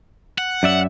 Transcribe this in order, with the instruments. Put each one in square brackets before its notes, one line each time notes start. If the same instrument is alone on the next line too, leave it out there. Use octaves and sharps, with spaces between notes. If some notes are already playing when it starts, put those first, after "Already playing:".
[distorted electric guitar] F#5
[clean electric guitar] F#2 D5 E5